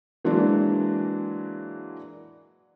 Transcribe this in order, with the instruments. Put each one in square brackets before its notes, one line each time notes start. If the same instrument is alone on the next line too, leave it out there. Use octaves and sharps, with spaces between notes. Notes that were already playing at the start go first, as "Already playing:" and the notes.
[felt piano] E3 F#3 G#3 A#3 D4 F#4